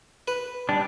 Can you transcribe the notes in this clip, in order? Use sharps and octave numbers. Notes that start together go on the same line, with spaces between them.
B4
G3 D4